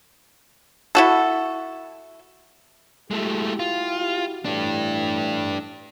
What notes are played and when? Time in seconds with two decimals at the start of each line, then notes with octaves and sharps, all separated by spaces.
0.95 E4 F#4 A4
3.11 G#3 A3 E4 F#4 G4
3.59 F4
4.45 A2 E3 D4 G4